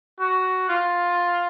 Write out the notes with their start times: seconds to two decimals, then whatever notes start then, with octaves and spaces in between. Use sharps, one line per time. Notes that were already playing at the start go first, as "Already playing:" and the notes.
0.20 F#4
0.69 F4